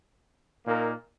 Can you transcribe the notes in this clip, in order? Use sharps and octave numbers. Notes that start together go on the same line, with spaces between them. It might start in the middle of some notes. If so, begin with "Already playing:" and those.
A#2 A#3 D#4 A#4